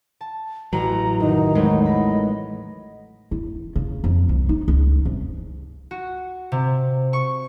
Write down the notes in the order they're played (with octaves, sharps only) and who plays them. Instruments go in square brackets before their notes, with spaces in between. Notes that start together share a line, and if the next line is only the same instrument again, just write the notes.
[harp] A5
[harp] A1 [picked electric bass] F#3 [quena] A#5
[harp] F1 [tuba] D#3 [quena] D#4
[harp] E2 C4 C#5 [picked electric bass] G#3 A3
[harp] F#3 B5 [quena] D#5
[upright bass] E4
C#3
F2
C2
D#4
C#2
C2
[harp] F#4
C3
C#6